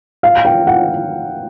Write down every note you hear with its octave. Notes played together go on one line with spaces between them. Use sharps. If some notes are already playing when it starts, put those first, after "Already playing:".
F5
G5
F#5